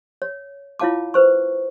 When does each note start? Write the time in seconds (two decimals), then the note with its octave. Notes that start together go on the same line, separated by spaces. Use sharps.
0.22 C#5
0.79 E4 F4 C#5 F5 A5 D6
1.14 B4 C5 C#6